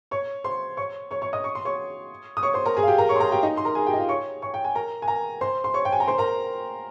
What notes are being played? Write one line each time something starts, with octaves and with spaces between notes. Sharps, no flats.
C#5 C#6
C5 C6
C#5 C#6
C#5 C#6
C#5 C#6
D#5 D#6
C#6
C6
C#5 C#6
D#6
C#5 C#6
C5 C6
A#4 A#5
G#4 G#5
F5
G4 G5
A#4 A#5
C#5 C#6
C6
A#4 A#5
G4 G5
D#4 D#5
C6
A#4 A#5
G#4 G#5
G4 G5
D#5
F4 F5
C#5 C#6
C#5 C#6
G5
G#5
A#4 A#5
G#5
A#4 A#5
C5 C6
C6
C#5 C#6
G5
G#5
A#5
C5 C6
A#4 A#5